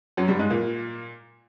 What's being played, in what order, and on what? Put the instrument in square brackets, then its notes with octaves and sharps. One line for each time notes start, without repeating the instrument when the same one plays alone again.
[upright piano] F#2 F#3
G2 G3
G#2 G#3
A#2 A#3